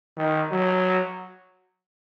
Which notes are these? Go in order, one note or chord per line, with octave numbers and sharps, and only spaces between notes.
D#3
F#3